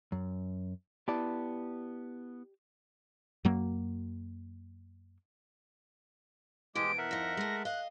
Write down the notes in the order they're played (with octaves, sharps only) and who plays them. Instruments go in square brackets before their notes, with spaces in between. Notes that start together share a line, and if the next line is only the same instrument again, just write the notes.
[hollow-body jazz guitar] F#2
[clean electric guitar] B3 E4 A5 [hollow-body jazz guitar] G4 D5
[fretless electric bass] F#2 F#3 A#3
[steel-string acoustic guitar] F2 B2 E3 [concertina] G#3 G4 [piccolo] D7
[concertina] A#4 E5 F#5
[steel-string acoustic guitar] F2 D#4 [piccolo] A#6
[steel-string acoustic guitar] G#3 A3 [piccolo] A#6
[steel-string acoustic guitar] D#5 F5 [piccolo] F#6